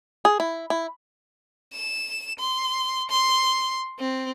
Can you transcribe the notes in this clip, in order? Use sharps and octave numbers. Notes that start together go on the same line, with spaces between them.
G#4
E4
E4
E7
C6
C6
C4